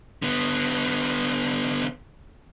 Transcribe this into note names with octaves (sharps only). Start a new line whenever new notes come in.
D3 B3